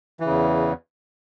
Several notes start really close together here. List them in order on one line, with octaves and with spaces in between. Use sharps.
E3 C#3 E2